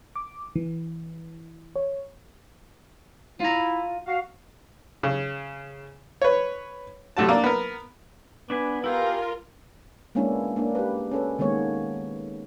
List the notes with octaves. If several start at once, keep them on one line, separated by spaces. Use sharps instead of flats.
D6
E3
C#5
E4 F4 A#5
F#4 F5
C#3
B4 C#5
A2 C3 A3 F#4 A5
A#3 D4
B3 A#4
B3 D4 B4 G#5
E4 F4 G4 G#4 A#4
G#3 A#3 B3 C#4 D4 E4
A#3 D4
G4 B4
C#4 A4 B4
D#3 G#3 A#3 B3 C#5